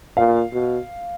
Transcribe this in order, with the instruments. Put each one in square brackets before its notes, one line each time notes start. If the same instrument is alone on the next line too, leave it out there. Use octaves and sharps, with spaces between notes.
[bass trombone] A#2 [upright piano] F5
[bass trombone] B2